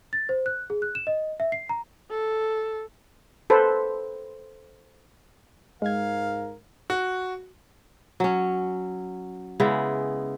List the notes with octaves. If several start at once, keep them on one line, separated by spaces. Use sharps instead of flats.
A6
C5
F#6
G#4
F#6
E7
D#5
E5
C7
A#5
A4
A4 B4 C5
G#2 G#3 A#4 F5 G#6
F#4
F#3 C#4
C#3 G#3 B3 E4